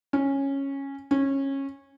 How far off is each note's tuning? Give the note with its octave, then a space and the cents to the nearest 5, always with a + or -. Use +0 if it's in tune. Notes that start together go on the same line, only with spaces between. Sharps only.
C#4 -10
C#4 -20